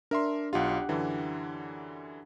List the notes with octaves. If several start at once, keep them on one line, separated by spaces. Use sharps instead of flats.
D4 A#4 E5 C6
B1 F4 G4 F#5
F#2 D3 E3